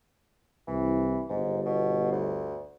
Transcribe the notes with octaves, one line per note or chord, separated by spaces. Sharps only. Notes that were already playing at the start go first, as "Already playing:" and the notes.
C2 E3
G1 G#2
B2
D2